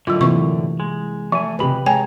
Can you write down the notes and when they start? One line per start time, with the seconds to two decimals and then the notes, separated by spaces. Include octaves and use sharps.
0.07 F#2 A2 D3 F#3 F4
0.21 C3 E3 A#3 C#6
0.80 G#3
1.32 F3 A3 G#5
1.59 C#2 C3 G#3 G4 B4 B5
1.86 G#3 C#5 G5 G#5 A#5